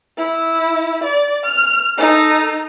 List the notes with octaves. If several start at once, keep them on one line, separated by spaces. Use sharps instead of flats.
E4
D5
F6
D#4 A4